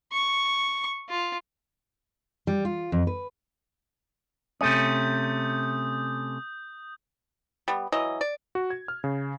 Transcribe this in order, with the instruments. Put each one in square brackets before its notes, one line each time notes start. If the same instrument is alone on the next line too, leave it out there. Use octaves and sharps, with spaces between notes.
[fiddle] C#6
F4
[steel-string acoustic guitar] G3
F4
F2
B4
[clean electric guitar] C3 A3 C#4 [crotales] D#6 G6
[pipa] G3 B3
E3 F#3 D#5
D5
[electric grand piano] F#4
G#6
F6
C#3